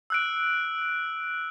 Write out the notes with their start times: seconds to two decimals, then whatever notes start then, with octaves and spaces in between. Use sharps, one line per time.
0.10 E6 F#6 D7